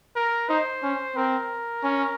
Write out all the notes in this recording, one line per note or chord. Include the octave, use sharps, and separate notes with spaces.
A#4
D#4 C5
C#4
C4 A#4
C#4